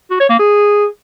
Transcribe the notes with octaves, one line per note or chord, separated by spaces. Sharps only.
F#4
C#5
A#3
G#4